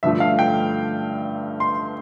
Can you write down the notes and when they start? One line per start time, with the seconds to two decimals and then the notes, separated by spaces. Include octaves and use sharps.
0.03 G2 D3 F3 A3 E5
0.20 F5
0.39 G5
1.60 C6